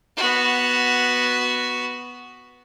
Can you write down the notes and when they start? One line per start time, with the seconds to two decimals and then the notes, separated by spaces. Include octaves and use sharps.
0.17 B3 F#4